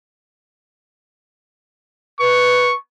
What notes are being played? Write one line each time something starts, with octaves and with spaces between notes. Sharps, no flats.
B4 C#6